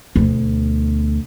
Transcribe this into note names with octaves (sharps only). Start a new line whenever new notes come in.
D2 B2